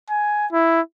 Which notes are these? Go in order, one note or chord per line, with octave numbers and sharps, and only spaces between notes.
G#5
E4